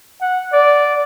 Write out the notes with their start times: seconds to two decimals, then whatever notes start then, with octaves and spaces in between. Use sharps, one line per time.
0.22 F#5
0.53 D5